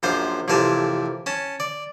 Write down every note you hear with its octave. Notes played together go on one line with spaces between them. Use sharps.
A#1 F#2 F4 C5
A1 F2 C3 A#4 G#5 A5
C#4 A5
D5